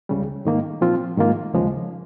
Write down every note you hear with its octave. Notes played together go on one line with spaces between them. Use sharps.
C#2 C#3 G3
G#2 D#3 A#3
A#2 F3 C4 F4
G#2 D#3 A#3 F4
D#2 C#3 F3 G#3